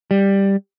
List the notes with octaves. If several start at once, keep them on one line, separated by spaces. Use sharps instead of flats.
G3